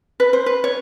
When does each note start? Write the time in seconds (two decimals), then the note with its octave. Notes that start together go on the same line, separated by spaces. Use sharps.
0.20 B4
0.33 C5
0.46 B4
0.64 C#5